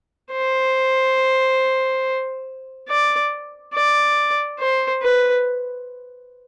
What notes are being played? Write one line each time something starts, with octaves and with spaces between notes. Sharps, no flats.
C5
D5
D5
C5
B4